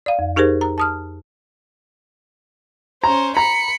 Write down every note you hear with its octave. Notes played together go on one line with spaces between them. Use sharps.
D5 F5
F2
D#4 G4 G#4 A#4 C5
A#5
A5 D#6 F6
C#4 C5 A#5
A#5 B5 C#7